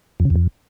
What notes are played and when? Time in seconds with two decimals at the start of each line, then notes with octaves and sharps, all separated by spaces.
0.20 F2
0.25 C#3
0.30 E2
0.35 F2